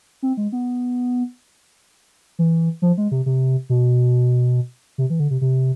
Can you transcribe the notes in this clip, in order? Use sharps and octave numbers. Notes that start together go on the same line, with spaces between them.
C4
G#3
B3
E3
F3
G#3
C3
C3
B2
C3
E3
D3
C3
C3